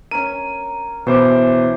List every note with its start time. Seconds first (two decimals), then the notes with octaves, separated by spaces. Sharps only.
0.11 C#4 A#4 D#7
1.07 B2 E3 C5 D6